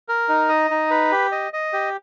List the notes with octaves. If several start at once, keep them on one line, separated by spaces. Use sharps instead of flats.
A#4
D#4
D#5
D#4
B4
G4
D#5
D#5
G4